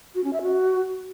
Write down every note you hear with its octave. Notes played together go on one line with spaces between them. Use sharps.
F#4
C#4
E5
F#4